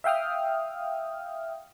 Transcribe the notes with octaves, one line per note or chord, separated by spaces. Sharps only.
E5 F5 G5 D#6 F6